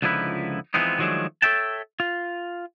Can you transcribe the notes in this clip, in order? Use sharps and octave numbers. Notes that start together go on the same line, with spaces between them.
C#2 D3 F3 D#4 E4 B4
E3 F3 G#3 B3 C4 D#4
D#3 F3 F#3 G#3 A3 D4
A4 C#5 E5 G5 A5
F4